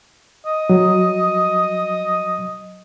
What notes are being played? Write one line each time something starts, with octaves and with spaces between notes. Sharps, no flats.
D#5
F#3